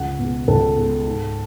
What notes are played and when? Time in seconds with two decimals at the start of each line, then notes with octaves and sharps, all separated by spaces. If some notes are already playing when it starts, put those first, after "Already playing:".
Already playing: C#2 F#5
0.19 B2 G#3
0.48 C#2 A4
0.77 B2 G#3
1.06 G#2